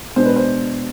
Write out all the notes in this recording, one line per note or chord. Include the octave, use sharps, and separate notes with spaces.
B2 G#3 B3 D4 C5
B4
C5